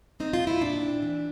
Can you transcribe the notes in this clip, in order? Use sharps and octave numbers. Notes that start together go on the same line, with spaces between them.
C4 D#4
F4
A#2
E4
A#2 D4
C4
E3